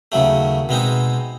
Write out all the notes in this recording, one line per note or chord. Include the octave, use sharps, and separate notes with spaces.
D#2 C#3 F#3 A3
B2 G#3 C4 D#4